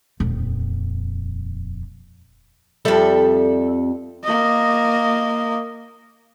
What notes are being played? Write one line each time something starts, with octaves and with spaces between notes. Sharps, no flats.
D#1 F2
F2 G3 A4 D5 E5
A#3 D#5